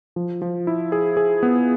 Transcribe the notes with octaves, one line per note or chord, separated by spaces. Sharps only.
F3
F3
E4
G#4
G#4
B3